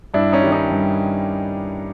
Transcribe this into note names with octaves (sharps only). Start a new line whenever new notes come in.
G2 D4 E4
C#4 D#4
D#3 G3
C#4 D#4
G2